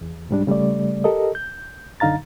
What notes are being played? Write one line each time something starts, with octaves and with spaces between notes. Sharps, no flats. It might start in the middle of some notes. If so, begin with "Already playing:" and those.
E2
C2 G#2 G3 D4
C#3 G3 A3 D5
G4 A4 A#4 D#5
G6
F#2 D3 D#4 F5 A#5 A6